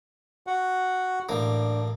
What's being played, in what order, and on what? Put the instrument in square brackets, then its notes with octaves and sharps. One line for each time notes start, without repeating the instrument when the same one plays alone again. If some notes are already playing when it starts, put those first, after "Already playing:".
[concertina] F#4 F#5
[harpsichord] A1 A#3 [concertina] D4